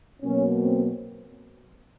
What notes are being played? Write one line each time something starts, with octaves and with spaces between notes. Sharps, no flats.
B2 F#3 A#3 C#4
C4